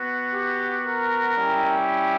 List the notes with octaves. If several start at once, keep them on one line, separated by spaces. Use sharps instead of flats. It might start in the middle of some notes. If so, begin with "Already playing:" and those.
Already playing: B3 F#4
G4
A#4
G3 C#4 E4 G4